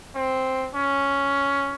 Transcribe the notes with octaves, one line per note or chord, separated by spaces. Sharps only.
C4
C#4